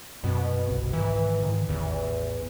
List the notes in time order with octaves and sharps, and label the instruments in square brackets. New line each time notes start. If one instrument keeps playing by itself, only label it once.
[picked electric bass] F#2 C4 [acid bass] B2
[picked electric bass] G1 C2
[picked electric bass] G#2 D#3 [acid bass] E3
[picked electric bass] G#2 D3 D#3
[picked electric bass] A1 [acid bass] E2